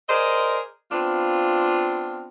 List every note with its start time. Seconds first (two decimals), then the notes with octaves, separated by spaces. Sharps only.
0.08 G#4 A#4 C5 D5 D#5
0.91 B3 C4 D4 F4